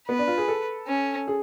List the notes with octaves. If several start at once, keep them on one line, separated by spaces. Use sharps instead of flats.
B3 B4
D4
F4
G#4
A4
C#4
G#4